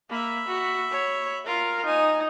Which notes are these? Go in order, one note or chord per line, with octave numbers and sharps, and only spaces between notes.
A#3 E5 B5
F#4
C#5
F4 A#4
D#4 G#5